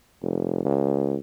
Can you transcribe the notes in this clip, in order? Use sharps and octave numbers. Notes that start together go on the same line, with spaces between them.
F1
C#2